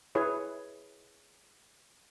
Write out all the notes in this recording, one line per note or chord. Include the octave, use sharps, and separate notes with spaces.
E4 G#4 B4 C#5